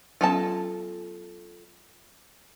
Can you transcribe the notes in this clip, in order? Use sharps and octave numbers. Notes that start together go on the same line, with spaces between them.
F#3 B3 C#4 F4 A4 A5